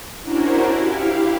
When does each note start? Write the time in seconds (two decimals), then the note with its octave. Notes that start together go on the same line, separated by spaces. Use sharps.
0.19 C#4 D4 E4 F#4 A#4 C5
0.74 E4 G4 F5